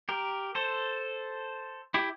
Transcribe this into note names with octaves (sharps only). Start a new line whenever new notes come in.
G4 A#4
A4 C5
E4 G4